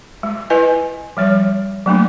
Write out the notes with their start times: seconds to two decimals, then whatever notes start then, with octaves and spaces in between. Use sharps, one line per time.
0.23 G#3
0.50 E4 B4 D#5 G#5
1.17 F3 G3 C#5
1.86 F#3 A3 A#3 D4